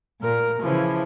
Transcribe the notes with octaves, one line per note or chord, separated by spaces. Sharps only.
A#2 A#4
C#3 E3 F3